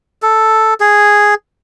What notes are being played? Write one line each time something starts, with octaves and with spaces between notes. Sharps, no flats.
A4
G#4